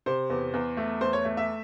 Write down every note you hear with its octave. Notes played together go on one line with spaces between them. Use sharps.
C3 C5
E2
E2
A3
E2 C5
C#5
A3
E5